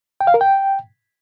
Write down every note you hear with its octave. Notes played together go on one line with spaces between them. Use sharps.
G5
F5
A#4
G5